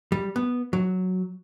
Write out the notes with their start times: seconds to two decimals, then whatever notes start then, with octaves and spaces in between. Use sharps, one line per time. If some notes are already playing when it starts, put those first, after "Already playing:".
0.12 G3
0.36 B3
0.73 F#3